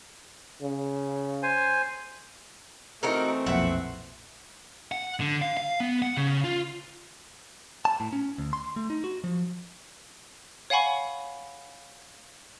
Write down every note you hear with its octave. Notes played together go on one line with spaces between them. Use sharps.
C#3
C5 G#5
E3 A3 C4 D#4 F#4 A#4
B1 F2 A#2 E5 F#5
F#5
D3
F5
F5
B3
F#5
C#3
F4
A5
A2
C#4
D2
C6
A3
D#4
F#4
F3
C#5 F5 F#5 G#5 B5 C#6